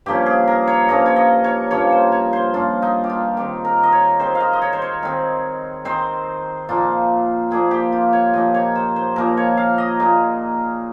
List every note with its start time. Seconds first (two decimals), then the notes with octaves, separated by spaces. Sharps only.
0.06 G2 F3 A#3 C#4 G4
0.26 G#4
0.48 A#4
0.67 C#5
0.88 G2 F3 A#3 C#4 D#5
1.06 C#5
1.16 D#5
1.44 C#5
1.71 G2 F3 A#3 C#4 C#5
1.92 C5
2.12 C#5
2.33 C5
2.53 G2 F3 A#3 C#4 F4
2.82 D#4
3.04 G4
3.10 F4
3.37 D#3 G#3 C4 G4
3.65 A#4
3.83 D#5
3.92 C#5
4.20 D#3 G#3 C4 C5
4.35 F5
4.40 D#5
4.53 D#5
4.62 C#5
4.73 C5
4.82 C#5
5.03 D#3 G#3 C4
5.85 D#3 G#3 C4 C5
6.69 A#2 F3 A#3 D#4 F4
7.51 A#2 F3 A#3 D#4 G#4
7.71 G4
7.92 F4
8.13 C#5
8.34 A#2 F3 A#3 D#4 D#5
8.54 C#5
8.76 C5
8.96 C5
9.16 A#2 F3 A#3 D#4 A#4
9.37 C#5
9.57 F5
9.78 D#5
10.00 A#2 G#3 D#4